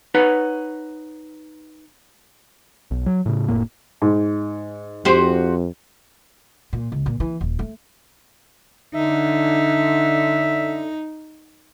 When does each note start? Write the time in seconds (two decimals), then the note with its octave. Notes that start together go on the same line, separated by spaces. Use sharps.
0.14 D#4 B4 C#5 F#5
2.91 B1
3.06 F#3
3.26 A2 C#3
3.48 F1 F2 A2 A#3
4.02 G#2
5.05 F2 F#4 G4 C5
6.73 A#2
6.92 C#2
7.06 A#2
7.20 E3
7.41 D#1
7.59 A3
8.95 D3 D#4 E5